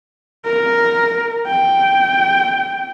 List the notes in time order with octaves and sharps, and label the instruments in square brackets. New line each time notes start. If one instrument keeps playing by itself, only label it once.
[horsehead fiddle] A#4
G5